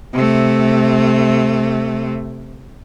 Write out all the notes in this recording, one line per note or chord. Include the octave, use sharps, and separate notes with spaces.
C3 A3